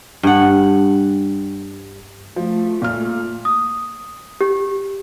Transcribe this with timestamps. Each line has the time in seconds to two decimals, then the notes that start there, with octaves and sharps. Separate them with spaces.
0.23 G2 F#5
2.36 F3 A3
2.82 A#2 F6
3.45 D#6
4.41 G4